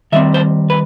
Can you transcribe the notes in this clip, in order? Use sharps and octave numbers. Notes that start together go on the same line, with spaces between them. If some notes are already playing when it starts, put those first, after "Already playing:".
D#3 G3 C4 E5
C5
B4